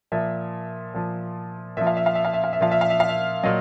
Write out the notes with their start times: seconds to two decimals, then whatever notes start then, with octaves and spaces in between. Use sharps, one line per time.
0.12 A#2 F3 E5
0.94 A#2 F3
1.77 A#2 F3 E5
1.87 F5
1.97 E5
2.06 F5
2.15 E5
2.25 F5
2.34 E5
2.44 F5
2.53 E5
2.61 A#2 F3 F5
2.71 E5
2.81 F5
2.90 E5
3.00 F5
3.09 E5
3.43 A#2 F#3 D#5